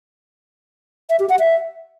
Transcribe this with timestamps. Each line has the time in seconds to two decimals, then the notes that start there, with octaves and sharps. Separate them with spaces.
1.10 E5
1.20 G4
1.29 F#5
1.39 E5